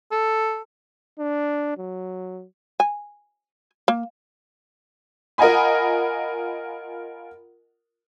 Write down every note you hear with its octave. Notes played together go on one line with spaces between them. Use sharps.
A4
D4
F#3
G#5
A#3
F4 A#4 D#5 F#5 G#5 B5